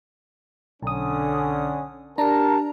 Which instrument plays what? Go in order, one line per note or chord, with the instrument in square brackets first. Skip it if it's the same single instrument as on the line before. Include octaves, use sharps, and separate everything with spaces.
[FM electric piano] B1 D#6 [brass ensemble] D3 C#4
[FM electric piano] D4 A#5 [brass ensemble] G4 A#4 A5